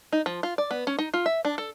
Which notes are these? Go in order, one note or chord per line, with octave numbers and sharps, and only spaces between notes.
D#4
F3
F4
D5
B3
C#4
D#4
F4
E5
D4
A4